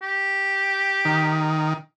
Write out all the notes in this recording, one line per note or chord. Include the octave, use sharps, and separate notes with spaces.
G4
D#3